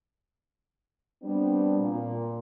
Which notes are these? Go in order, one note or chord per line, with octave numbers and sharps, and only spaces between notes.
G3 B3 C4 D4
A#2